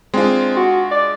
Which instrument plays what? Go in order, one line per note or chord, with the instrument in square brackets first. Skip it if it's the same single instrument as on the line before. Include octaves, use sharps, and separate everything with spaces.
[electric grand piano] G#3 D4 F4 [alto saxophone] C4
[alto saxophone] F#4
D5